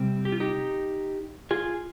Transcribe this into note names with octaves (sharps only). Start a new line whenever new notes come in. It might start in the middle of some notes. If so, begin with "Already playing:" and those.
Already playing: C3 G3 C4
G4
F4
D#4 G4
F4 G#4